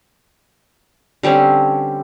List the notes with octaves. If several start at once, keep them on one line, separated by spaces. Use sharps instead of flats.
D3 G3 C4 C#4